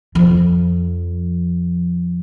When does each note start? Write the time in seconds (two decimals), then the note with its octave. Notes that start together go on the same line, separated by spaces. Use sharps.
0.15 F2 F3